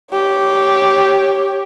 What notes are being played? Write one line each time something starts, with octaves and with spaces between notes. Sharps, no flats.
G4 C#5